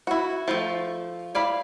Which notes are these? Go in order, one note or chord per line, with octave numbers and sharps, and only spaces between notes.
E4 F#4
F3 A3 A4
E4 D5 F5 B5